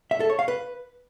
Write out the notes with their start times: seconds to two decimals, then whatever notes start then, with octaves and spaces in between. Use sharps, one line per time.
0.11 E5
0.20 A4
0.30 C#5
0.39 F5
0.48 B4